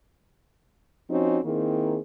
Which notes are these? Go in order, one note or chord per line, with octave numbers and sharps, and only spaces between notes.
F3 C4 C#4 D#4 F#4
D#3 A#3 C4 E4 G#4